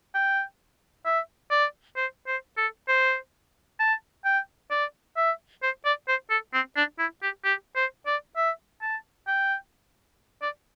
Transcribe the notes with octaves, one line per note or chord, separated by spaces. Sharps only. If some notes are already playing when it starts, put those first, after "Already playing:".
G5
E5
D5
C5
C5
A4
C5
A5
G5
D5
E5
C5
D5
C5
A4
C4
D4
E4
G4
G4
C5
D5
E5
A5
G5
D5